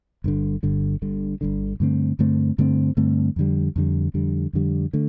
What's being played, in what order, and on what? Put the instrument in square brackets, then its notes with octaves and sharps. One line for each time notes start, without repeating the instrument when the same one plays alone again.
[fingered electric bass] G1 G2 D3
G1 G2 D3
G1 G2 D3
G1 G2 D3
G2 D3 A3 C4
G2 D3 A3 C4
G2 D3 A3 C4
G2 D3 A3 C4
F2 D3 G3
F2 D3 G3
F2 D3 G3
F2 D3 G3
D3 A3